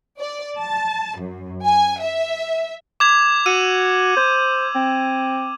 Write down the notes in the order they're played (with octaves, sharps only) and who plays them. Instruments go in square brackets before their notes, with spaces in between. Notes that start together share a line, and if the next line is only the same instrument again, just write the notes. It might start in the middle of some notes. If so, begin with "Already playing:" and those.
[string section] D5
A5
F#2
G#5
E5
[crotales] D6 G#6 F7
[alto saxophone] F#4 [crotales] E6 D#7
[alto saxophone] C5
C4